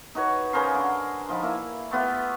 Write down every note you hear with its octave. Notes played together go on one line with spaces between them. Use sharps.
D#4 F#4 B4 C#5
C#3 G#4 A#4 C5
D3
F3 D#4 B5
A#3 E4
A3 B3 F4 G4